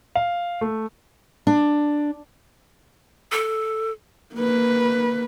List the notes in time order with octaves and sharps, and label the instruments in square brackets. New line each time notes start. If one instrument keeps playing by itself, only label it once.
[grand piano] F5
A3
[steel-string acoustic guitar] D4
[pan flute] A4
[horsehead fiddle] A#3 B4